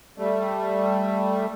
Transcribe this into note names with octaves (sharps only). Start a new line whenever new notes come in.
G3 A3